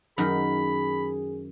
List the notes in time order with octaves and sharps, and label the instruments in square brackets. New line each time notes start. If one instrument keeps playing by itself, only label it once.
[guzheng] F#2 D#3 A#4 [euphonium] G#4 [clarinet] B5